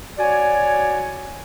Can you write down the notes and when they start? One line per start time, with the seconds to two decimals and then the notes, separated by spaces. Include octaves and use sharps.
0.19 F#4 C#5 D5 G#5